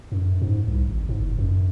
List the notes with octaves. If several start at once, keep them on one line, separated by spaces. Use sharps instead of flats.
F#2
G#2
C2
G#1
G#2
F#1
F#2